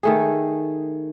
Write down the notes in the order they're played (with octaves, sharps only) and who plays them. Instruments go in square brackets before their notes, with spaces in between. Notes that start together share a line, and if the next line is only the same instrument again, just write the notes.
[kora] D#3 A3 G#4